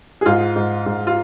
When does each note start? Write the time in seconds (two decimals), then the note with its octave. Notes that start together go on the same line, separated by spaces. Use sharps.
0.21 G#4
0.26 G#2 F4
0.56 G#2
0.86 G#2
1.07 F4